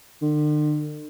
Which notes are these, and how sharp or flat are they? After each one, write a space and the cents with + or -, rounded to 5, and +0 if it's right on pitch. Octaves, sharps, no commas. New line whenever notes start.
D3 +45